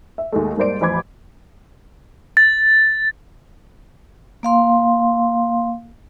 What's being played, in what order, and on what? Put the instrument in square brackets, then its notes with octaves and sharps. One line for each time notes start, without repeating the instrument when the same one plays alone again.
[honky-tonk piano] E5
D#2 G#3 A3
G#2 G3 A#3 C5 D5 D7
A1 F2 C5 B5 D6 G#6
[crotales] A6
[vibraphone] A#3 F5 C6